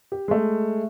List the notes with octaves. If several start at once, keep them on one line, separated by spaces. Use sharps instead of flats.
G4
G#3 A3